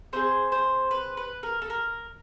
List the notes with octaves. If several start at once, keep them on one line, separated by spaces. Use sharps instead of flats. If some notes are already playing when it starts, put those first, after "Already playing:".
C4 D#4 G#4 C5
C5
B4
B4
A#4
A4
A#4